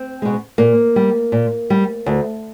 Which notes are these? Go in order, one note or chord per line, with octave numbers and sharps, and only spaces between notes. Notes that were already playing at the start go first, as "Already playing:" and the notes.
Already playing: C4
B2 G#3
A#2 A#3
G3
A#2
G3
D2